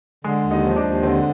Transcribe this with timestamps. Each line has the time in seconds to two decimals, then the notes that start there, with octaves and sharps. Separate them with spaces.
0.24 D3 G#3 G#4
0.44 D#2
0.51 D#4 D#5
0.64 F3
0.76 D4 D5
0.83 D#2
1.03 D3 C4 C5